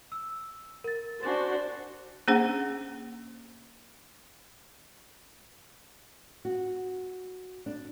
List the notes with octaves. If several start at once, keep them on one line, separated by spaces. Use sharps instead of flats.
E6
A#4 A6
D4 F#4 C5 G#5 A6
A#3 C#4 D4 G#4 C5 F#5
F#4
D4